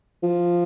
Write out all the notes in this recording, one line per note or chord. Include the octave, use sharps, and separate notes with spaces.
F3